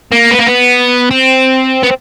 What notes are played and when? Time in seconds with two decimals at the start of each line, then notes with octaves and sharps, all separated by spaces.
0.12 A#3
0.31 B3
0.39 A#3
0.47 B3
1.11 C4
1.83 B3